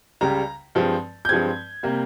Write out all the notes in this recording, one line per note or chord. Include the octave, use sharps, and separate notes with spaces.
C#2 C#3 G3 A#5
G2 F3 G#3 C4
G6
G2 F3 G#3 C4 G#6
C3 G3 A#3